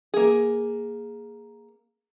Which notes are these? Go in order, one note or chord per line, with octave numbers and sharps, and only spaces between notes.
A#3 G#4